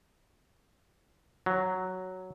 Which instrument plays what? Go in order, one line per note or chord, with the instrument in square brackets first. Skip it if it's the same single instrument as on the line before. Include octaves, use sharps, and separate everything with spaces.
[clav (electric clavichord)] F#3